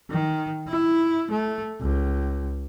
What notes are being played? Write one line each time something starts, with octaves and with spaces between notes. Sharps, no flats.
D#3
E4
A3
C#2